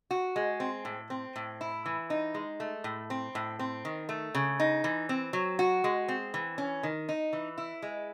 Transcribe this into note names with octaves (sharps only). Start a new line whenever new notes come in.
F#4
G#3
C4
A2
C4
A2
E4
E3
D#4
G#3
A3
A2
C4
A2
C4
D#3
A3
C#3
D#4
E3
C4
F#3
F#4
G#3
C4
E3
C#4
D#3
D#4
E3
E4
G#3